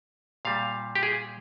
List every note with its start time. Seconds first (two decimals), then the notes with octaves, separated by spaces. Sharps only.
0.45 A#2 G3 F5
0.95 G4
1.03 G#4